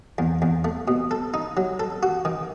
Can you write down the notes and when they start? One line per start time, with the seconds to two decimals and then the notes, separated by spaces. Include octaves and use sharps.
0.18 E2
0.42 E2
0.65 A3
0.88 B2
1.11 A4
1.34 D#4
1.57 F#3
1.80 A4
2.03 F#4
2.25 D#3